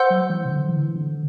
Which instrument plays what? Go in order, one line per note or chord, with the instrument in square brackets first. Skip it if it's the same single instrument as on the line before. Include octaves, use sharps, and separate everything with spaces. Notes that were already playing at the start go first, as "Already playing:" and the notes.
Already playing: [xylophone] C5 F#5 C6 E6 G6
[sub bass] F#3
E3
C3
D3
E3
D3